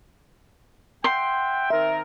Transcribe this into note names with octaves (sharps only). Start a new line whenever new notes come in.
E5 F#5 G5 C6
D#3 C4 A#4 E5